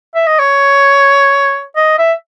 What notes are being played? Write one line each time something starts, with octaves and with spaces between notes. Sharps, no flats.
E5
D#5
C#5
D#5
E5